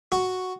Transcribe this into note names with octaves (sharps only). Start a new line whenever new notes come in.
F#4